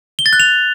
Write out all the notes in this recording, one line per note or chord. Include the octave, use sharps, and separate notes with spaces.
G7
A6
F#6
F7